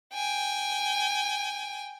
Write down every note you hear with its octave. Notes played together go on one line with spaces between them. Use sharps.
G5 G#5